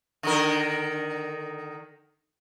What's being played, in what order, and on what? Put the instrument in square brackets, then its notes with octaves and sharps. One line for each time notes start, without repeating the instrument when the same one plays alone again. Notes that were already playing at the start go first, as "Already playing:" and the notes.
[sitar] D3 D#3 A#4